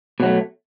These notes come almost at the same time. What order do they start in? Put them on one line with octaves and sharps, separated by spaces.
B2 F#3 A3